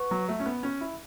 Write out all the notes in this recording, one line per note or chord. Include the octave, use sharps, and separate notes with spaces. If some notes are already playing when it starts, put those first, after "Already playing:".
Already playing: B4 F#5 C#6
F#3
A3
C#4
B3
C#4
E4